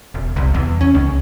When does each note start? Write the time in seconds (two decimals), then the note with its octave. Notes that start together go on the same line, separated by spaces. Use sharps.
0.14 E1
0.36 C2
0.54 E2
0.81 C#4
0.94 C#2